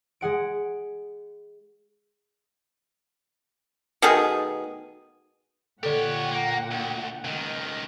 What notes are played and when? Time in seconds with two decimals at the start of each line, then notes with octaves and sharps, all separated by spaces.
0.21 G#3 G#4 F#5 D7
4.02 B2 D#3 A3 G#4
5.83 A#2 D3 G4 A4 C#5 F#5 G5
6.31 A#3
6.71 D2
7.24 C#2 D#3